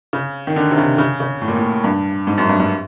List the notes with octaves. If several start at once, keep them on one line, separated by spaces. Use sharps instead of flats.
C#3
D#3
D3
C3
C#3
C#3
C#3
A2
A#2
A2
G2
G#2
F#2
G2
G2